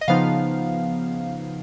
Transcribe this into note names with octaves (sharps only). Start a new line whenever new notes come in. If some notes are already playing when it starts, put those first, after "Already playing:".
D#5
C#3 F3 B3 D#4 F5